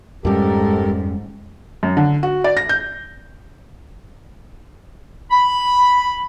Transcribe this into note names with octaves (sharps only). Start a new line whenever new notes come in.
F2 G#2 G3 C#4 G4 A4 A#4
F#2
D3
F#4
D5
A#6
G6
B5